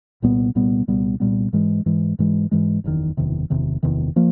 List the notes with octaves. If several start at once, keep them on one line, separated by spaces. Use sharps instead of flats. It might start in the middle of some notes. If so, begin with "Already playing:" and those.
C2 A#2 G3 B3
C2 A#2 G3 B3
C2 A#2 G3 B3
C2 A#2 G3 B3
G#2 E3 G#3
G#2 E3 G#3
G#2 E3 G#3
G#2 E3 G#3
F#1 E2 C3 D#3
F#1 E2 C3 D#3
F#1 E2 C3 D#3
F#1 E2 C3 D#3
F3 A#3